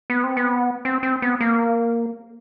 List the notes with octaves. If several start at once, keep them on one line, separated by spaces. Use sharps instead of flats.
B3
C4
B3
C4
C4
B3
A#3